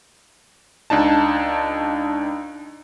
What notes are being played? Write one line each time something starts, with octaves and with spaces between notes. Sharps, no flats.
C#2 D4 D#4 A5